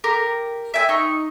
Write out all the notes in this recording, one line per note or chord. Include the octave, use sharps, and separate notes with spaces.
G4 A#4
E5 G5 G#5 E6
D#4 C#6